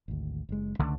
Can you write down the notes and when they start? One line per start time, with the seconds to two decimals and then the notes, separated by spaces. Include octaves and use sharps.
0.08 G#1 D2
0.49 F#1 G#3
0.79 C#2 D3 A3 D4